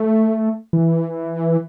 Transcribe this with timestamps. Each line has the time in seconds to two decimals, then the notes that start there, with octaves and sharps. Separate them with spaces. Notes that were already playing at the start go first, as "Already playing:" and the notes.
Already playing: A3
0.73 E3